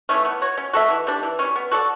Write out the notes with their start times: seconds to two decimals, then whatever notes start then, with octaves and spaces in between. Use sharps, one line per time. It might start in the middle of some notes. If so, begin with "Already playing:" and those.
0.09 E3 A3 C#4
0.25 B3
0.42 F#4 C#5
0.58 C#4
0.73 F#4 A4 E5
0.90 E3
1.07 G3 D4
1.23 E3
1.39 G3 C#4
1.56 B3
1.71 F#4 A4 D5